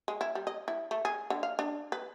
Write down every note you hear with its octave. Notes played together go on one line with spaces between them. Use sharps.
G#3
E4
G3
D#5
E4
A3
G#4
D3
F5
D4
B4